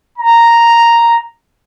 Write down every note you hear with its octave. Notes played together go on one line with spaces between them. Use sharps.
A#5